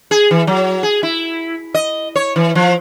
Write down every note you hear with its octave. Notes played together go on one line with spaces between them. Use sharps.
G#4
E3
F#3
G#4
E4
D#5
C#5
E3
F3